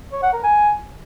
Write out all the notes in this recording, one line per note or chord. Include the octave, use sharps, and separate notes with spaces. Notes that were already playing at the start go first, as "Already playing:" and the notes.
C#5
F#5
A#4
G#5